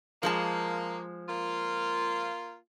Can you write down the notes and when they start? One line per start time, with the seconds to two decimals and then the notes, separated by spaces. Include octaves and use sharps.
0.23 F3 G#3 A#3 A5
1.29 A#3 F4